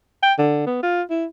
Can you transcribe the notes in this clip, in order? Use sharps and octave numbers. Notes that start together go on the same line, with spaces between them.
G5
D3
B3
F4
E4